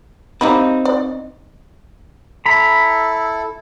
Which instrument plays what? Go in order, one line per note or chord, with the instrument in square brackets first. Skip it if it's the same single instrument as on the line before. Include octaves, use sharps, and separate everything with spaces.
[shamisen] G3 A#3 B5 [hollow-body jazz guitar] C4 D#4
[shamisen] D5
[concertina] E4 A4 [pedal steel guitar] A#5 B5